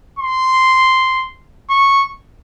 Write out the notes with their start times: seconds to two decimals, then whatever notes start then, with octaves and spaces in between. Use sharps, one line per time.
0.19 C6
1.70 C#6